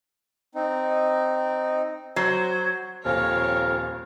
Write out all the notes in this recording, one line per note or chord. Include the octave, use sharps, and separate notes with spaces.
C4 D#4
F#3 C5
D#1 F2 A#4 C#5 F5